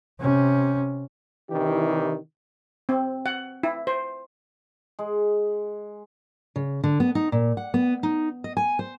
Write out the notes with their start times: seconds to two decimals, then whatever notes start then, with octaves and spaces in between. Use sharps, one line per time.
0.20 C3 C#4
1.50 C3 D#3 E3 D4 E4 G4
2.89 C4
3.26 F#5
3.63 E4
3.87 C5
4.99 G#3
6.56 C#3
6.84 D3
7.00 B3
7.15 D#4
7.32 A#2
7.57 F#5
7.74 B3
8.03 D#4
8.44 D#5
8.57 G#5
8.79 C5